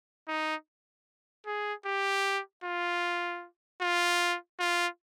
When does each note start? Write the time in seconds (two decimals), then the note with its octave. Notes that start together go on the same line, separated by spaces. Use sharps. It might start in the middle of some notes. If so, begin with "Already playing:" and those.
0.28 D#4
1.46 G#4
1.86 G4
2.64 F4
3.81 F4
4.60 F4